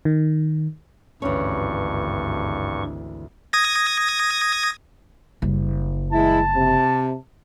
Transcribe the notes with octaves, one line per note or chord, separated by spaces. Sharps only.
D#3
G#1 D2 G2 E3 C#4 C#6
D#6 G#6 A#6
F#1 G3
E3 G#3 E4 A5
C3